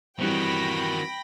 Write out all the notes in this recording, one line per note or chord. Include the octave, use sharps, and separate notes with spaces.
D#3 E3 G3 C4 F#4 G5 B5 A#6